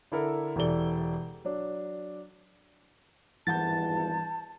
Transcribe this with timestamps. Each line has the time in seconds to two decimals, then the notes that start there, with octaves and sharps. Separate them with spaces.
0.12 D3 E4 A4 A#4
0.56 E1 C3 E3 A4 D5 G7
1.45 F#3 D4
3.47 G#1 E2 G2 E3 F#5 A5 G6 A6